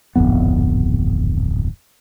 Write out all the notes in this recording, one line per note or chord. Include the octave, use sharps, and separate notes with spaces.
D1 G#1 F2 B3